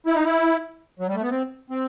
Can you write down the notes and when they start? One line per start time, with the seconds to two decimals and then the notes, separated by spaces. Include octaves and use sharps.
0.07 E4
0.15 D#4
0.25 E4
1.00 F#3
1.08 G3
1.15 A3
1.22 B3
1.30 C4
1.70 C4